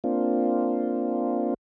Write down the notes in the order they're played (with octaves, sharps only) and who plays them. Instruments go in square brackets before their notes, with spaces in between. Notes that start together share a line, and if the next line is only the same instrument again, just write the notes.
[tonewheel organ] A#3 C4 D4 F4